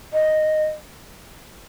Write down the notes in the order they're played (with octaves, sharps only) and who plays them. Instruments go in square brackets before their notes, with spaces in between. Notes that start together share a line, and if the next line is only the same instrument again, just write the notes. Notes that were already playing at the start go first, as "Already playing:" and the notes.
[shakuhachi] D#5